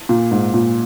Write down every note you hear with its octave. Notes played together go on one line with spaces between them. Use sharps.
A#2
G#2
A#2